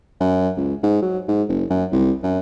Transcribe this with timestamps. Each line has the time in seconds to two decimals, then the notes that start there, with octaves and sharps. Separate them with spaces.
0.21 F#2
0.57 C#2
0.83 G#2
1.02 F#3
1.28 G#2
1.49 F#1
1.70 F#2
1.92 C2
2.23 F#2